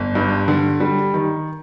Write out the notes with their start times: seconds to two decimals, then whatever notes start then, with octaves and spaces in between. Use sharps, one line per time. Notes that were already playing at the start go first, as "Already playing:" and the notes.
Already playing: G1
0.15 G2
0.48 D3
0.80 G3
1.14 D#3